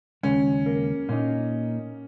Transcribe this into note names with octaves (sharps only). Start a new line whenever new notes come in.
D#2 C#3 G#3 C#4
A#3
A#2 A#3 C#4 D#4